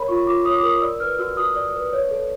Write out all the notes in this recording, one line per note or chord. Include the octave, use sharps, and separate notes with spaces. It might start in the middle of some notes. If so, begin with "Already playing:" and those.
Already playing: A#4 C#5 B5
F4 C#6
F4 D6
C#5 D#6
D6
A#4 D#6
D5 E6
B4 F6
F#4 E6
F#4 D#6
D5
B4
C#5
A4